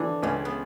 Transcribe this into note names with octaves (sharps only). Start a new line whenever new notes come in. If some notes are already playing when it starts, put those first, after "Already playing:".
Already playing: D3 E3 C4 D4
C#2 C#3 C#4
B3